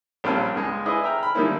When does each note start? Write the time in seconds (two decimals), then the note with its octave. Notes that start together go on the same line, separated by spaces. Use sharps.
0.24 A#1 G3 C4 C#4 F5 A5
0.55 C#2 C#3 G#3
0.86 E4 G#4 B4 D5 D#5
1.03 E5 G5 A#5 F6
1.19 B5 F6
1.35 D3 D#3 G3 G#3 A#3 E4